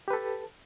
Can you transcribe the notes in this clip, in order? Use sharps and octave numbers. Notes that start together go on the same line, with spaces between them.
G4 A4 B4 A5